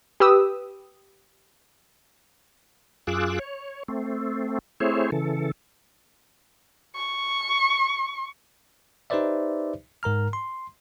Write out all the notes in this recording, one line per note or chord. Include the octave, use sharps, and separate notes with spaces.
G4 B4 D#6 E6
F#2 F4 G#4 D6 E6 F#6
C#5
A3 C4
A3 C4 E4 G#4 C5 C#5
C#3 E3 A4
C#6
D#4 G4 B4 C5 D5 E5
G#2 A#4 A#5 F6
C6